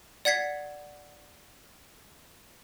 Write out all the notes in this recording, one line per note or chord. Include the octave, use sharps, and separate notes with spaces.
D5 F#5 G#6 B6 C7